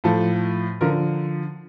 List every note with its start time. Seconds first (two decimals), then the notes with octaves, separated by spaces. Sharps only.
0.04 A2 F3 A4
0.81 D3 F3 A#4